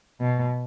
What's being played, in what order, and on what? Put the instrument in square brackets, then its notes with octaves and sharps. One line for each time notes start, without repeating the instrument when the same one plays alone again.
[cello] B2